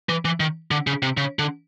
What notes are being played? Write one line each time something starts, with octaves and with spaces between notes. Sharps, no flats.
E3
E3
D#3
D3
C#3
C3
C#3
D3